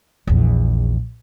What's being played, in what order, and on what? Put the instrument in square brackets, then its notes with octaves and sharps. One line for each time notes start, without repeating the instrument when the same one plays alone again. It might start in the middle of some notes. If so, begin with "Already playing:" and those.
[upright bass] A#1 E2